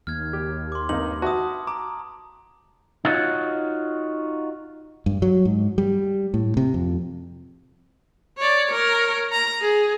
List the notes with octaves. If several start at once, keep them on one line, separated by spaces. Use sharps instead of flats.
D#2 F6 G#6
G4
C6 D6
G2 C3 A#3 D#4 F#7
F#4 B4 E5 A5 D#6
A#5 D6
D#4 F4 F#4 C#5
G2
F#3
G#2
G3
A2
C3
F2
C#5 D5
A#4 C#5
A#5
G#4